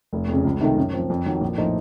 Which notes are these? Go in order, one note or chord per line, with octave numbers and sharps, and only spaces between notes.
F1
F2 C#3
C#2
C3 D#3 A3 D#4
F#2
F3 C4
F2
D#3 F#3
A#1
A2 F3 A#3 D#4